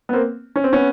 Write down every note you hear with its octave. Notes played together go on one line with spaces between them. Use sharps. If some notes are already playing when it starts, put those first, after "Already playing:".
B3
A#3 C4
C#4
C4
B3 C#4